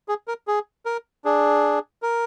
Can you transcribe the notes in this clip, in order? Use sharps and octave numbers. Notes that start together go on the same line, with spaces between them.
G#4
A#4
G#4
A#4
D4 G#4
A#4